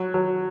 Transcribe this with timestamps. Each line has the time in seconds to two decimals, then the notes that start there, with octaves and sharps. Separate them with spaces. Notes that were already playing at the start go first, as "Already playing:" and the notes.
Already playing: F#3
0.14 F#3